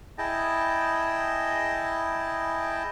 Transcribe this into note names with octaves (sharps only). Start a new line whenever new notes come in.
E4 G#4 D#5 G5 A5